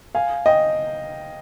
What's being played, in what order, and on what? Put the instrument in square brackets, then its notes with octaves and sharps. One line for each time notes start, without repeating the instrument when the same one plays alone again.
[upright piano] F5 G#5
D#5 G5